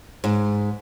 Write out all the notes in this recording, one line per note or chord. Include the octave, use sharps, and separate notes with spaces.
G#2